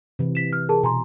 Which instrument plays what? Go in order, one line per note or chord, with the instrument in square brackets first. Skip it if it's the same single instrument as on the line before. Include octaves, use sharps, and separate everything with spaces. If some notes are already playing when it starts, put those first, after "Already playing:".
[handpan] C3 E3
[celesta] B6 E7
F6
G#4 A#4 A5
[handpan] B2 [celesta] G#5 A#5 C6